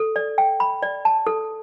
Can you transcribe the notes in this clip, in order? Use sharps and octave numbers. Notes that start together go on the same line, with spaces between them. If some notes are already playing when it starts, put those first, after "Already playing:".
Already playing: A4
D5
G5
B5
D5
A5
A4